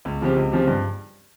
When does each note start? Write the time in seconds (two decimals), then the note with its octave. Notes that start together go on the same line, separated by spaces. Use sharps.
0.05 C#2
0.21 C#3 F3 C4 G4
0.36 C#2
0.52 C#3 F3 C4 G4
0.68 G2